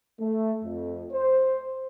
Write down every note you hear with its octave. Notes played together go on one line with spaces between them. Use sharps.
A3
F2
C5